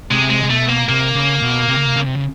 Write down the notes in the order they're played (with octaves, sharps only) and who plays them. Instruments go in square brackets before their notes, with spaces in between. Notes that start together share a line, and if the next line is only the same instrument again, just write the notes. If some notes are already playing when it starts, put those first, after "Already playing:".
[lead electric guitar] C3 [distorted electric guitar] G#3
[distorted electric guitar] G#3
[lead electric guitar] C3
[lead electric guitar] B2 [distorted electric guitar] A3
[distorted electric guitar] A#3
[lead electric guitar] C3 [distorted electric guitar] A#3
[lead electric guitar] C#3
B2
C3
C#3
C3
C#3
C3
C#3